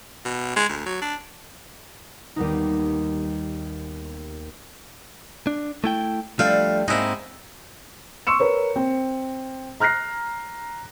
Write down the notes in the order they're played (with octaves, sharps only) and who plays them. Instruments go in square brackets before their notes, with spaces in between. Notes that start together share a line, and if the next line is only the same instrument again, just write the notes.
[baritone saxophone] B2
G#3
D2
F#3
D4
[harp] D#2 G3 B3 D#4
[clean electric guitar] D4
A3 E4 G5
[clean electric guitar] F3 A3 D4 [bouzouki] G3 [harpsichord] F5
[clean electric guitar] G#2 C4 [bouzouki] G#3 A#3 [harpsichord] D#4 E4
[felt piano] C6 C#6 E6 C#7 E7
A#4 B4 C#5
C4
A#5 F6 F#6 A#6 C7